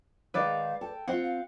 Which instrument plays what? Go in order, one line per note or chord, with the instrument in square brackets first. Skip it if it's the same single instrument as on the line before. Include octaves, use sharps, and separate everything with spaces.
[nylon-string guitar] D#3 G#3 D#4 [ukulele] B4 D5 [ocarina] F5
[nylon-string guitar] A4 [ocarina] G5
[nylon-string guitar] C4 F4 [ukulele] F#5
[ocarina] F5